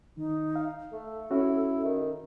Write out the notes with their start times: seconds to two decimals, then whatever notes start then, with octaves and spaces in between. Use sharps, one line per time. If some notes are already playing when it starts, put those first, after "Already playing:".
0.17 D#3 D#4
0.56 F5
0.92 A3 A4
1.31 C#4 E4 F#4
1.85 D#3